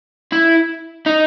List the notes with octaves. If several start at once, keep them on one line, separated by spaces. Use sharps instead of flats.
E4
D#4